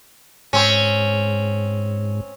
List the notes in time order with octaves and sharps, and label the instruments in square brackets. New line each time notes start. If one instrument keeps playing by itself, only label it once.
[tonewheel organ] G#2 [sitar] C4 C#4